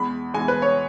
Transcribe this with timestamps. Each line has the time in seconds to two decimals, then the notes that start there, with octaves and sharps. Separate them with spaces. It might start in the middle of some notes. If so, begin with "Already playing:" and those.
Already playing: E2 E3 G#3 B5
0.34 E2 E3 G#3 G#5
0.48 B4
0.62 C#5